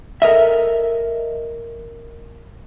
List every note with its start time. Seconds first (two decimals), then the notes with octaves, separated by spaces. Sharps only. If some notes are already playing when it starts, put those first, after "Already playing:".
0.22 A4 A#4 D#5 E5